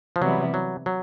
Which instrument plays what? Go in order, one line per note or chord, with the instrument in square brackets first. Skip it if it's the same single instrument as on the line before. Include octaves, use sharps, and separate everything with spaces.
[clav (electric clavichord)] F3
[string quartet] C3 E3 G3 B3 E4 [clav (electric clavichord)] F#3
[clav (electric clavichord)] F#3
F#3